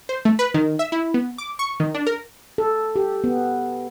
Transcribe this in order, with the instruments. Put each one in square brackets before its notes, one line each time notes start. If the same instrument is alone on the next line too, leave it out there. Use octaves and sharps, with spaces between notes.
[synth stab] C5
A3
B4
D#3
E5
E4
B3
D6
C#6
D#3
D4
A#4
[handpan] A4
G4
B3